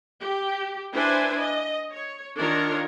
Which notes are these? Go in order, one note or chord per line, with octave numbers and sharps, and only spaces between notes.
G4
D4 E4 B4 C5 G#5
D#5
C#5
D#3 D4 F4 A#4 C#5